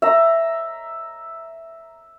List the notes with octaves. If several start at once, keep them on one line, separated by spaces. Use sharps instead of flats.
E5 A#5